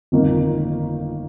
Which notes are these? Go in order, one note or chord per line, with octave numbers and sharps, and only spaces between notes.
G1 F2 D#3 A#3